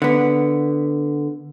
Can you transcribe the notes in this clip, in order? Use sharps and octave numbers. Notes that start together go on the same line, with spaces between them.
D3 B3